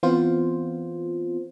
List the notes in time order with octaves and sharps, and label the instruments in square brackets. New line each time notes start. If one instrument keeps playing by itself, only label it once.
[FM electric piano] E3 B3 C4 F4 C5